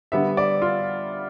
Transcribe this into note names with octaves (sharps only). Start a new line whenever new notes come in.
D3 G3 B3 E5
D5
F4